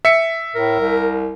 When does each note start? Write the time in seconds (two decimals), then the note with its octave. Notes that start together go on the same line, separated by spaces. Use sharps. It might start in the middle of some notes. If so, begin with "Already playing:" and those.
0.05 E5 C#7
0.55 A2 A#4
0.79 C2